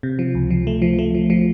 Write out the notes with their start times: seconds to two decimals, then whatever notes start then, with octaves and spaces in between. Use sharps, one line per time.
0.03 C3
0.19 F3
0.35 C#2
0.50 F3
0.67 A3
0.82 F3
0.99 A3
1.14 F3
1.30 F3